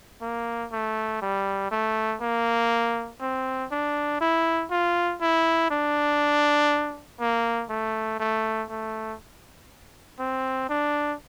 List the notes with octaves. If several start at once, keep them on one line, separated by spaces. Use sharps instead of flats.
A#3
A3
G3
A3
A#3
C4
D4
E4
F4
E4
D4
A#3
A3
A3
A3
C4
D4